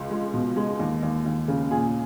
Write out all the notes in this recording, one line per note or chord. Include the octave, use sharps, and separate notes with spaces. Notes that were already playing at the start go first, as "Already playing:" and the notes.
Already playing: C#2 G#3
G#3
B2
G#3
D#2
D#2
D#2
C#3
A#2 G#4